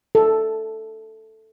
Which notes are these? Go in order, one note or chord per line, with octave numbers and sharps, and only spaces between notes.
A4